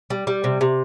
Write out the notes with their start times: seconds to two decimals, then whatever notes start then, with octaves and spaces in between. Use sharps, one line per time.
0.10 G3
0.27 G3
0.44 C3
0.61 C3